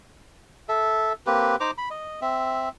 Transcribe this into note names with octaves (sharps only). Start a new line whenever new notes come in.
A4 E5
A#3 C4 G4 B4
D#4 C5 A#5 D6
B5
D#5
C4 E5